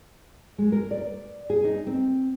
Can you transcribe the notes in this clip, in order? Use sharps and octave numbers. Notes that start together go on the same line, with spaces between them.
G#3
A#4
D5
G#4
D#4
C4